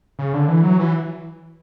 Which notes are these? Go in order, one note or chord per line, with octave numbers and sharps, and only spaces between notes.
C#3
D3
E3
F#3
E3